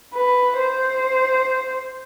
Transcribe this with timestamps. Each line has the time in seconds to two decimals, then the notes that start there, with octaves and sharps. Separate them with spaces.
0.14 B4
0.59 C5